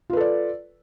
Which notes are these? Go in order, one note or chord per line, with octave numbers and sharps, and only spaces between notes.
F4 A4 B4 D5